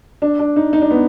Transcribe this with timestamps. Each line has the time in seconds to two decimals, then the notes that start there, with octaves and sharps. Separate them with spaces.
0.22 D4
0.39 D4
0.56 D#4
0.73 D#4
0.82 D4
0.91 B3